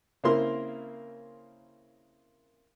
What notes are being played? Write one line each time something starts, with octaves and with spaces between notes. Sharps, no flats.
C#3 A#3 C4 E4 A#4 C6